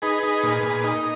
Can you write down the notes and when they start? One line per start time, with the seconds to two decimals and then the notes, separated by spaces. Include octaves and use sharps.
0.02 D#4 G#4 B4
0.23 D#4
0.43 A#2
0.63 A#2
0.84 D#4